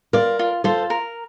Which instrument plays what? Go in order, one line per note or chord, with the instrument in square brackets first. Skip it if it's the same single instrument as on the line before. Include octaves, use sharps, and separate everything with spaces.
[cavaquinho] F4 [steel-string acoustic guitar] A#4 D5
[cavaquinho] F4
[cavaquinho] F4 [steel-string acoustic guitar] A4 C5
[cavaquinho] A#4